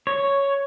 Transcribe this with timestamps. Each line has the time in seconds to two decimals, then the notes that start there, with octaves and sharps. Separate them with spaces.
0.07 C#5